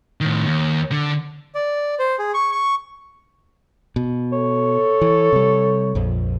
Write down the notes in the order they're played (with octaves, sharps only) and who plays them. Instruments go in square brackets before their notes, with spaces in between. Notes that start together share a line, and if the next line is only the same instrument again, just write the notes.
[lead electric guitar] A2 D#3
D#2
D3
[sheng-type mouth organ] D5
C5
G#4
C#6
C#6
[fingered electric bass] B2
[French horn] A4 [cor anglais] C#5
[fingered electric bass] E3
C3 G3
A#1 F2